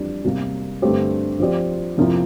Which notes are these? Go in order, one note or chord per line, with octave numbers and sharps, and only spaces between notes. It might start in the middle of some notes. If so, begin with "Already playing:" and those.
Already playing: F2 E3 G3 D4
C3 G3 A#3
G2 D3 A3 C4 G4
F3 C4 G4 D5
F2 C3 F3 A#3 E4